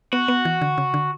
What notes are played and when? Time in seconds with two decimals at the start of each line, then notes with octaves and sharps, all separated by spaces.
0.13 B3 F#4
0.28 B3
0.45 E3
0.62 D3
0.78 C#3
0.94 D3